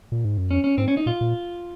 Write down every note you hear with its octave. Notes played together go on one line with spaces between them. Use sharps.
A#2
G#2
F#2
F2 C#4
C#4
G#2 C4
C#4
D#4
A#2 F4
A#2